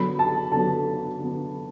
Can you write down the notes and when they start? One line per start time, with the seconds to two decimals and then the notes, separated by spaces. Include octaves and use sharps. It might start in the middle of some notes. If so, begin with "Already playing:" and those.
Already playing: D3 F#3 B3 B5
0.19 A5
0.52 D3 F#3 B3 A5
1.19 D3 F#3 B3